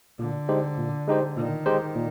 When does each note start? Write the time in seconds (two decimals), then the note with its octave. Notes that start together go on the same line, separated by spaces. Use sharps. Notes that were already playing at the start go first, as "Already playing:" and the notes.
0.19 A#2 D3
0.49 G#3 D#4 G4 C5
0.78 A#2
1.08 G#3 D#4 G4 C5
1.37 A#2 D#3
1.66 G#3 D#4 G4 C5
1.95 A#2